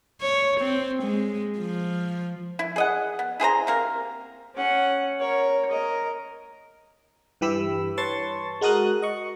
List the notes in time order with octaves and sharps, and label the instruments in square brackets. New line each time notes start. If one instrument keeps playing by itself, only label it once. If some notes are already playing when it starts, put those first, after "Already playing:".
[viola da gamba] C#5
C4
G#3
F3
[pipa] E4
G#4 D#5 F#5
B3
E4 G#4 C5 A#5
C3 A#3 A#4
[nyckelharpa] C#4 F#5
A#4 C#5
A#4 D#5
[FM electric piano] G2 E3 G4 B5 E6
B4 C#5 A5 C6 C#6 A6
G#3 F#4 A#4 D#6 F#6
D#5 C#6